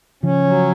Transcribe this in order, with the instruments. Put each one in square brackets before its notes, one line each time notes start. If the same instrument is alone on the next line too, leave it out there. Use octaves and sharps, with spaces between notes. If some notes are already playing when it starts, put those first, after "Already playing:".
[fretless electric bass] C#3 F3 [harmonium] C#4
[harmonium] F#3